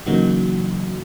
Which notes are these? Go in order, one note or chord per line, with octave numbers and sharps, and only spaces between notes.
C#3 E3 F#3 A#3 D#4 F#4